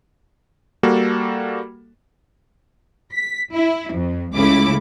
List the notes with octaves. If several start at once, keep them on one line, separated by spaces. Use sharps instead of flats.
G3 A#3 F#4 A4
B6
E4
F2
C#2 C#3 A3 E4 D6